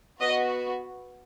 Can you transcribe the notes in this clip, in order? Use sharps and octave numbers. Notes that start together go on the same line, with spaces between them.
B3 F#4 B4 D#5